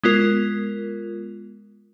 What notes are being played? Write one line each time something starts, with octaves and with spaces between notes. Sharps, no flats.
G#3 B3 F4 A#4